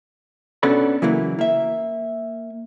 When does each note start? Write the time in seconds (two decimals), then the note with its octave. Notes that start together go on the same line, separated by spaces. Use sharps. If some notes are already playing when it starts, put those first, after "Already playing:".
0.63 B2 B3 C#4 D4 A4 B5
1.02 C#3 E3 F#3 A#3 E4
1.39 A#3 E5